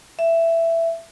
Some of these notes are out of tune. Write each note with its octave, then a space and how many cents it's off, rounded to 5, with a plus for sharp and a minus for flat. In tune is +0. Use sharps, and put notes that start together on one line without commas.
E5 +10